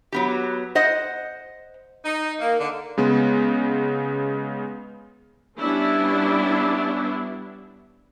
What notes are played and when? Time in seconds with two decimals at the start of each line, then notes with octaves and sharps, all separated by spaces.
0.12 F#3 B3 G4
0.75 C5 D#5 F#5
2.04 D#4
2.40 A#3
2.59 D3
2.98 C#3 G#3 B3
5.57 G3 B3 C#4 D4 E4